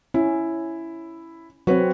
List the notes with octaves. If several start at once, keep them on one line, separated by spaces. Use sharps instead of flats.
C#4 E4
F#3 C4 F#4 B4 C#5